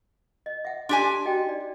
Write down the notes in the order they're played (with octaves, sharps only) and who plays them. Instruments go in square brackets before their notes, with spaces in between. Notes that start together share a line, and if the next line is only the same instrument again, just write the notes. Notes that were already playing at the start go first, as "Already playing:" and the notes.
[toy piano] D#5
E5 F#5
[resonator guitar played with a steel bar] D4 G4 G#5 [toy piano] C6
[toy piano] F#4 D#5 G5
D#4 D5